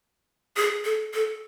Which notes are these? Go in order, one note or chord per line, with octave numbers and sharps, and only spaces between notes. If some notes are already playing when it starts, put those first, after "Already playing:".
G#4
A4
A4